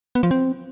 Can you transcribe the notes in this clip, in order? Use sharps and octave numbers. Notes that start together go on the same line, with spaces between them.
B3
F3
C4